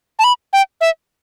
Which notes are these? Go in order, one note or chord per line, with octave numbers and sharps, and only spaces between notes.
A5
B5
G5
E5